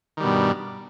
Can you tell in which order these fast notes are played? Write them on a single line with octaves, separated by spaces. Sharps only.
D#3 G3 B2 G2